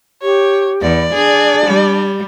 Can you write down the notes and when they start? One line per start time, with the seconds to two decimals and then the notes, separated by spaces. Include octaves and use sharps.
0.22 G4 C#5
0.82 E2 D5
1.14 D4 G#4
1.66 G3